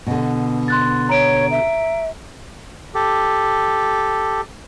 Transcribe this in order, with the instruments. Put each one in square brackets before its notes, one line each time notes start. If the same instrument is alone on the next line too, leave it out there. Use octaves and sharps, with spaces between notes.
[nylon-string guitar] B2 D3
[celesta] C6 F#6 A6
[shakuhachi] C#5 [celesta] A#5 D7
[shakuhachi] E5
[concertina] G4 A4